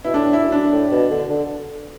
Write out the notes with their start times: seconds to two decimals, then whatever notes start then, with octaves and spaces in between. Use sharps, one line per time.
0.04 B2 E4
0.14 A2 D4
0.33 E4
0.43 F#2
0.52 D4
0.72 A2
0.91 B2
1.11 D3
1.30 D3